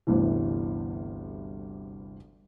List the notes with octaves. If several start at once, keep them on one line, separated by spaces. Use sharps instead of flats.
G1 D2 G2 C3 E3